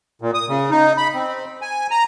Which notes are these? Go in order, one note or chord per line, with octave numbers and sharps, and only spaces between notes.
A#2
D#6
C#3
D#4
B5
C4
G#5
A#5